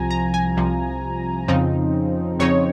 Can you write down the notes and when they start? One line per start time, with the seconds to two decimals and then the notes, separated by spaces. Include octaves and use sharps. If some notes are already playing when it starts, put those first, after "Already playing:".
Already playing: C2 C3 F3 G#5 A#5
0.11 A#5
0.34 G#5
0.57 C2 C3 F3
1.48 F2 C#3 F3 C4 D#4
2.39 F2 C#3 F3 C4 D#4 C#5